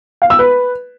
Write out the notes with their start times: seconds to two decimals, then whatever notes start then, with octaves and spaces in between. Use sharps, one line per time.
0.22 F5
0.30 E6
0.39 B4